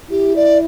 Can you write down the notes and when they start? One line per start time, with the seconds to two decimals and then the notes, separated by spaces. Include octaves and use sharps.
0.11 E4 G4
0.36 D5